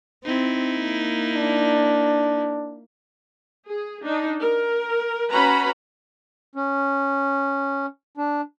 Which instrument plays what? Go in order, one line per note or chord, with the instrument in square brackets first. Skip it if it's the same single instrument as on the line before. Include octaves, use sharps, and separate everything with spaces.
[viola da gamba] C4 [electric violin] D#4 E4
[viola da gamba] A#3
[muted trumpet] D4
[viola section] G#4
D4 D#4
A#4
C#4 F#4 B4 A#5 B5
[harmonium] C#4
D4